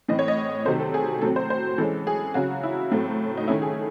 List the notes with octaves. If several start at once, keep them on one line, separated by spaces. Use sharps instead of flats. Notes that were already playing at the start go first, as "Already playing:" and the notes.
A2 E3 C4 D#5
C#5
D#5
C3 D#3 F#3 A3 C5
A4
G#4
A2 F#3 C4 A4
C5
C5
E3 G#3 C#4 A4
G#4
C#3 F#3 C#4 F#4
E4
A2 F#3 A3 C4
D#4
D#3 A3 C#4 E4
G#4